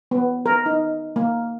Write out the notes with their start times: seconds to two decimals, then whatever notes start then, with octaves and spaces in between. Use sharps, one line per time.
0.11 B3
0.46 A#4
0.66 D#4
1.16 A#3